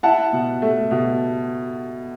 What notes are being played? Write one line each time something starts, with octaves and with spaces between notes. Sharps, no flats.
E4 F#5 A5
B2
A3
B2